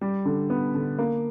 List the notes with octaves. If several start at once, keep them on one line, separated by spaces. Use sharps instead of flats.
G3
D3
B3
D3
A#3